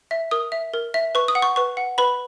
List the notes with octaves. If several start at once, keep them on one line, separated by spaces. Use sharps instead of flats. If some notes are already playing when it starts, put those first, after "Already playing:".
E5
A#4 D#6
E5
A#4
E5
B4 C#6
D#6
F#5
C#6
B4 C#6
F#5
B4 B5